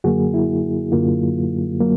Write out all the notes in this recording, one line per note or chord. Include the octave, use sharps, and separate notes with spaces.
F#2 D3 F#3 A#3 F#4 G#4
E4
F#2 D3 F#3 A#3 F4
F#3 A#3